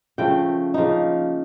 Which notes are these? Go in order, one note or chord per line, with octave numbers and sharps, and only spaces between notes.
C#3 F3 A3 G5
C#3 F3 A#3 D#4